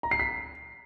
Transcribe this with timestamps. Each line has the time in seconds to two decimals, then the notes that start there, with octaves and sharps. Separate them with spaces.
0.03 A#5
0.11 C7
0.20 B6